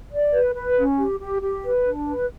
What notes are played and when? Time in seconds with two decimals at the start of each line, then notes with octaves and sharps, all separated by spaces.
0.12 D5
0.33 B4
0.55 B4
0.77 C#4
0.98 G4
1.20 G4
1.42 G4
1.64 B4
1.85 D4
2.07 B4